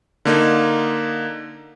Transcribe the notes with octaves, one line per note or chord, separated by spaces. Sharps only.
D3 A#3 D#4